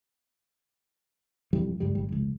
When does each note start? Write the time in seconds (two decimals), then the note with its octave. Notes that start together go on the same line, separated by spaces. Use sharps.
1.53 E1 F2 E3 G3
1.80 C#2 G2 G3
1.95 G#1 G3
2.09 F1 C#2